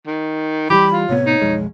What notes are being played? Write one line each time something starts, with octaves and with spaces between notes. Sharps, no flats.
D#3
E3 F3 G3 G4 B5
F4
A2 C3 B3 C#5
D#4
B1 F2 G#3